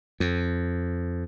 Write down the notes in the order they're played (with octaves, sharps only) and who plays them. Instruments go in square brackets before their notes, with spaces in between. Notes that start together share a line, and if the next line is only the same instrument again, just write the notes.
[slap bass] F2